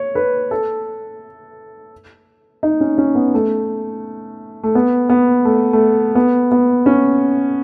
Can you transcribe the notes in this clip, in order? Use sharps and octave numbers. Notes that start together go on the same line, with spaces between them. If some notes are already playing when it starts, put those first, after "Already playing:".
Already playing: C#5
B4
A4
D#4
C#4
C#4
B3
A3
A3
B3
B3
A3
A3
B3
B3
C#4